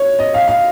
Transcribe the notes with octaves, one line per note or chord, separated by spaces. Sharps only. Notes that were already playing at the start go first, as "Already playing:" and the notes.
Already playing: C#5
D#5
F5
F5